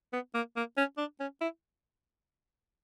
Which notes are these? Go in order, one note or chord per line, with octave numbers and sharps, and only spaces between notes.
B3
A#3
A#3
C#4
D4
C#4
E4